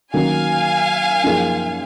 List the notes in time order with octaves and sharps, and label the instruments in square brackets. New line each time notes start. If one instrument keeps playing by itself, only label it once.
[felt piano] D#3 F#3 A#3 C#4 [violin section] F5 G#5
[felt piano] F#2 F3 A#3 D#4 G#4